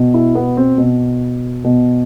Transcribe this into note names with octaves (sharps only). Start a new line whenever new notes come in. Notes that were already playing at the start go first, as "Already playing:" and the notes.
Already playing: B2
E4
B3
C4
B2
B2